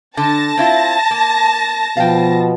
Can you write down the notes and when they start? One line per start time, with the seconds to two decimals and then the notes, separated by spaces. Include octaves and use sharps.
0.17 D3 A5 A#6
0.57 C4 E4 F4
1.11 A#3
1.97 B2 F3 F5 G5